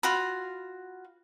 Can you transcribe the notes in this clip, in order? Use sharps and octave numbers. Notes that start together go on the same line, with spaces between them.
F4 F#4 B5